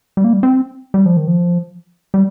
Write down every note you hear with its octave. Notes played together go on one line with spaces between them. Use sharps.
G3
A#3
G3
C4
G3
F3
D#3
F3
G3